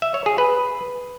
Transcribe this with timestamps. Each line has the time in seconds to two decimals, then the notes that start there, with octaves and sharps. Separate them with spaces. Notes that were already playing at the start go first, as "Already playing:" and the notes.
0.02 E5
0.14 C#5
0.26 G#4
0.38 B4